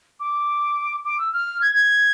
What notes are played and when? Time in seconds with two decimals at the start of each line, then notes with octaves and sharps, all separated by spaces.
0.20 D6
1.04 D6
1.18 E6
1.33 F6
1.61 G#6
1.75 G#6